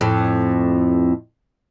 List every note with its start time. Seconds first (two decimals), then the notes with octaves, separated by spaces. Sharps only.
0.01 F2 A2